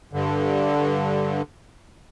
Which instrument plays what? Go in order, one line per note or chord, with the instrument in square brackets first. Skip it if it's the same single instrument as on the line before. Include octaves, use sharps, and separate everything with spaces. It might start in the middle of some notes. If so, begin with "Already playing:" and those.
[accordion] G2 D3